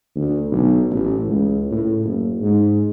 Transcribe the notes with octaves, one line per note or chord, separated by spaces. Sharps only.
D2
B1
A1
C#2
A2
F#1
G#2